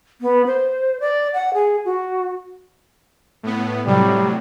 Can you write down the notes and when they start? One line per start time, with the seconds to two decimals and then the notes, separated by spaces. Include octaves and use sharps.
0.21 B3
0.46 C5
1.00 D5
1.34 F#5
1.54 G#4
1.85 F#4
3.43 A2 B3
3.87 A2 C3 F#3 G3